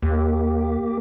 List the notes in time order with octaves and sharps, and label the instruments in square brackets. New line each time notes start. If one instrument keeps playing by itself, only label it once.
[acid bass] D#2 [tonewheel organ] A#3 G4